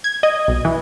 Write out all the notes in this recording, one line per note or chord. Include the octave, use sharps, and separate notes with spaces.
G#6
D#5
B1
E3